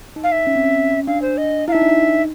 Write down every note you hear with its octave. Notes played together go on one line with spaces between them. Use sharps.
D#4
F5
E5
C#4
C4
C#4
D4 F5
C5
D#5
E4 F5
D#4 E5
D4
D#4